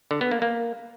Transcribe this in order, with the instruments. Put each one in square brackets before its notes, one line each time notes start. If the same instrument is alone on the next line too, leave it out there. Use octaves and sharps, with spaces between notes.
[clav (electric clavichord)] D3
B3
A#3
A#3